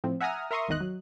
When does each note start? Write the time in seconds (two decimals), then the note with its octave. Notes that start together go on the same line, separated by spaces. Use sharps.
0.04 A2 F3 C4
0.21 E5 F#5 G#5 A#5 D#6 F6
0.51 A#4 E5 A#5 C6 C#6 D#6
0.68 G#1 E2 D#3 D#5 F#6
0.81 F#3